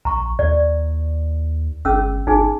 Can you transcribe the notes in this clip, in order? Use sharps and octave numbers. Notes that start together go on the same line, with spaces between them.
A#1 A#5 C#6
D#2 D5
G1 C#4 G#4 E6
G1 D#4 G#4 G#5